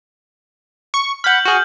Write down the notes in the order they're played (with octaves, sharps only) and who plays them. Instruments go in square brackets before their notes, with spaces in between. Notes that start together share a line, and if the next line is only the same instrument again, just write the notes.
[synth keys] C#6
[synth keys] F#5 B5 [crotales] F6 G6 F#7
[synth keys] F#4 G#4